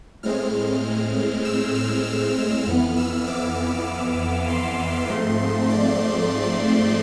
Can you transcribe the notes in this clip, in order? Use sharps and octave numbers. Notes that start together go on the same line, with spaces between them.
A2 G#3 C4 F6
E6
F6
E6
E6
F2 E3 B3 F6
E6
D6
C6
G#2 F3 A3 C4
D5